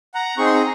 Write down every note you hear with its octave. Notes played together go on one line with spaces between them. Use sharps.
F#5 A#5
C4 D#4 G#4 C#6
C6
A#5